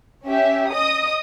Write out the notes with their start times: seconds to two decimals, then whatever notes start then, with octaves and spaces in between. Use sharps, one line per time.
0.25 C#4 G4 E5
0.73 D#5 D#6